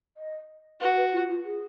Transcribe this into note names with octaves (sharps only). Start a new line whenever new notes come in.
D#5
F#4 B4
B4
F4
F4
G#4